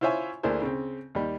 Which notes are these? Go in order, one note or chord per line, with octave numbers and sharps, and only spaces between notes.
E4 F4 C5 C#5 E5 G#5
D2 A#3 D4 E4 G#4 C5
C#3 C4
D#2 G3